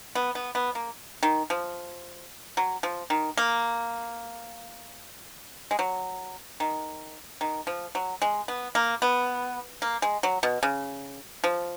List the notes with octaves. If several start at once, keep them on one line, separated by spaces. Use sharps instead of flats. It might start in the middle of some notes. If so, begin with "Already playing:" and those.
B3
B3
B3
A#3
D#3
F3
F#3
F3
D#3
A#3
G#3
F#3
D#3
D#3
F3
F#3
G#3
B3
A#3
B3
A#3
G#3
F#3
B2
C#3
F3